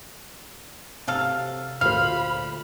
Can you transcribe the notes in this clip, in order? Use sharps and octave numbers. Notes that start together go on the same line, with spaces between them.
C3 F#3 A4 F5
D2 A#2 C5 F5 B5 F6